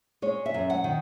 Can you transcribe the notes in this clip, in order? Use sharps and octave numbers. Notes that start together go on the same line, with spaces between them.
G#3 C#5
E5
F#2
F#5
D#3